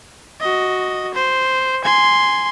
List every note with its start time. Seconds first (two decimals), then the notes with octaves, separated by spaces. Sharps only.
0.40 F#4 D#5
1.14 C5
1.84 G#5 C6